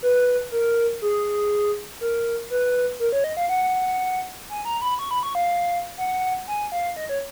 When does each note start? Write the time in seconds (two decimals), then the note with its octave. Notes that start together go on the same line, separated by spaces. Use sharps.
0.02 B4
0.52 A#4
1.02 G#4
2.01 A#4
2.50 B4
3.00 A#4
3.12 C#5
3.24 D#5
3.37 F5
3.49 F#5
4.49 G#5
4.65 A#5
4.82 B5
4.99 C#6
5.11 B5
5.23 C#6
5.35 F5
5.98 F#5
6.48 G#5
6.72 F5
6.96 D#5
7.09 C#5